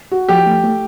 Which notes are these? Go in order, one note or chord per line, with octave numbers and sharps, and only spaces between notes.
F#4
F3 G4
A3
A3